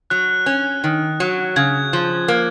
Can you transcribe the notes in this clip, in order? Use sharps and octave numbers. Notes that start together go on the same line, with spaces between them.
F#3 F#6
C#4
D#3
F#3
C#3 G#6
F3
A#3